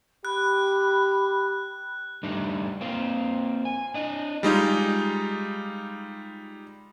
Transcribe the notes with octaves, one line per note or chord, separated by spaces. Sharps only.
G4 B5 F#6
G3 A3 D4 D#4
A#3 C4 F4
G#5
D4 D#5
G3 G#3 D#4 F4